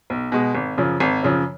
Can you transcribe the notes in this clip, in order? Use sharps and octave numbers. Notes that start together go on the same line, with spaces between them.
B1
B2 G#3
G#1
F#2 C#3 F3
G#1
F#2 C#3 F3